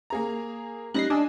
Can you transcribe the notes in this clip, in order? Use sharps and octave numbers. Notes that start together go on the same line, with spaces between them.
A#3 G#4 A#5
G3 C#4 D#4 F#6 A#6 C7
D4 D#5 G#5 E6